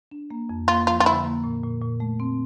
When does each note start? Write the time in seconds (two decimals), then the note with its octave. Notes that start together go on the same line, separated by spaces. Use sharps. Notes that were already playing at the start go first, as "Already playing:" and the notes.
0.11 D4
0.30 A#3
0.49 F2
0.68 A#3 F4
0.87 F3 F4
1.00 F4
1.06 D3 E4
1.25 A#3
1.44 A#2
1.63 A#2
1.82 A#2
2.00 A3
2.20 C4